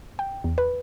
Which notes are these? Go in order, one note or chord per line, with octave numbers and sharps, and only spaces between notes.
G5
E2
B4